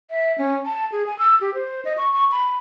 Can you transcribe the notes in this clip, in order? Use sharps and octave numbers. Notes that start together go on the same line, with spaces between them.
E5
C#4
A5
G#4
G#5
E6
G4
C5
D#5
C#6
C#6
B5